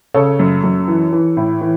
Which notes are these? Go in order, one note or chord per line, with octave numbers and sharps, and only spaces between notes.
C#3 A4 C#5
F#2
F#2
E3
E3
A2
E3